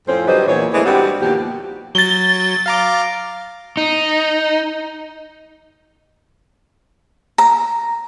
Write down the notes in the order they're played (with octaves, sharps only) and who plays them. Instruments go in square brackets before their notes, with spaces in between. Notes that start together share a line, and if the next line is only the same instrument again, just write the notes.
[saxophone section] F2 A2 F3 C4 C#4 C5
D3 F#3 G3 B4 C5 D#5
E2 A#2 C#5
D3 E3 G#3 A3 C4 D4
G2 G3 C4 F#4 G4
D#2 B2 F3 G4
[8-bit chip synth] F#3 [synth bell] A6 G7
[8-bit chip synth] F5 A#5 D6
[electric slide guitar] D#4
[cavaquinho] A#5